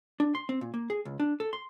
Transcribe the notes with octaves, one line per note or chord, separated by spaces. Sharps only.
D4
C6
C4
A#2
A#3
G#4
C#2
D4
A4
C6